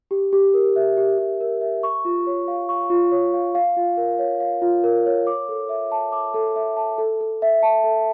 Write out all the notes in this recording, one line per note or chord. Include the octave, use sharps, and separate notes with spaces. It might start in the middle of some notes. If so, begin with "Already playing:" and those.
G4
G4
A#4
E5
G4
G4
A#4
E5
C#6
F4
C#5
F5
C#6
F4
C#5
F5
F5
F4
A#4
C#5
F5
F4
A#4
C#5
D6
A4
E5
A5
D6
A4
E5
A5
A4
A4
E5
A5
A4